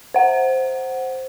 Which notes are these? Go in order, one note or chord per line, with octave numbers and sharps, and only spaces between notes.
C5 F#5